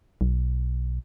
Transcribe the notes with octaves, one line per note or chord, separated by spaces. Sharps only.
B1